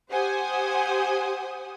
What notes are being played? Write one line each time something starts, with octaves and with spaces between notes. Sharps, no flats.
G4 C5 F#5 G#5 D#6